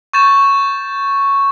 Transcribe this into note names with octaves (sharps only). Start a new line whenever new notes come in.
C#6 G6 A6 E7